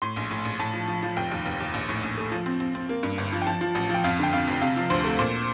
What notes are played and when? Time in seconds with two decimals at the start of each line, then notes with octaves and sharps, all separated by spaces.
0.02 A2 C6
0.16 A#1
0.31 A2
0.45 A#1
0.59 A2 A5
0.73 F3
0.88 F3
1.02 F3
1.16 F1 G5
1.31 D#2
1.45 F1
1.60 D#2
1.74 A#1
1.89 A2
2.03 A#1
2.17 A3
2.31 F3
2.46 C4
2.60 C4
2.75 C4
2.89 A#3
3.03 G2
3.18 G1
3.32 F3
3.42 G5
3.47 F3 A5
3.61 F3
3.75 A1
3.90 F3 G5
4.04 F2 F5
4.19 D3 G5
4.33 F2 F5
4.47 F1
4.61 C3 F5
4.76 F3
4.90 D2 C5
5.04 A3
5.19 A#2 C5